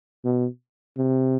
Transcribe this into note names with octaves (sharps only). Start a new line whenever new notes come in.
B2
C3